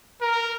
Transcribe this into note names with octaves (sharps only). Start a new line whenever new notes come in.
A#4